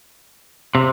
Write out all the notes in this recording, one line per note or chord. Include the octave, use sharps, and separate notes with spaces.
C3